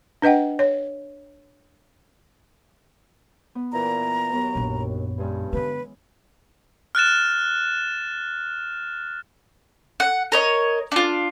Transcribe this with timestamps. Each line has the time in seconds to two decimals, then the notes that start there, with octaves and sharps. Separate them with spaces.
0.22 D4 B4 D#5 F#5 G5
0.59 C#5
3.55 B3
3.72 A#2 E3 A#5
4.33 D#2 F#3 B3
4.55 A#1 F#2
5.18 G2 E3 G#3 C#4
5.53 D3 B3 B4
6.95 F6 F#6 A6 E7
10.00 F#5
10.32 A#4 C#5 D#5
10.92 D4 F4